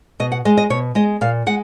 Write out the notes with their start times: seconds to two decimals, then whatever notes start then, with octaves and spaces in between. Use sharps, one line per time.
0.20 B2 D#5
0.32 F#5
0.45 G#3 D#5
0.57 D#5
0.70 B2 C#5
0.95 G#3 D#5
1.21 A#2 F5
1.46 G#3 F#5